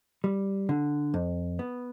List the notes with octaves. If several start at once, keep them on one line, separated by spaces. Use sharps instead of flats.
G3
D3
F2
B3